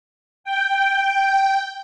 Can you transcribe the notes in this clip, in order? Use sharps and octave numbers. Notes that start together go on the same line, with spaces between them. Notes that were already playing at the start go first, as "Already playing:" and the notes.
G5